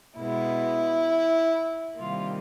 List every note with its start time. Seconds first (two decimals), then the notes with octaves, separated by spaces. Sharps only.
0.17 B2 G#3 B3 E4
1.97 C3 D#3 G3 A#3 F4